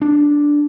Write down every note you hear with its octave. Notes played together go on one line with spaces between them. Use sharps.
D4